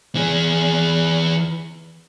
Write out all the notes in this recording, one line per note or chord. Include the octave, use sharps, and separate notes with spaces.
E3 G#4